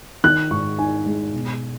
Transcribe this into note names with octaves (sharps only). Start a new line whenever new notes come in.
D#3 F#6
G#2 C#6
D#4 G#5
G#3
B2